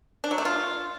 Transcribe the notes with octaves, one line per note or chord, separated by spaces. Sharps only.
D4
F#3
A3
F4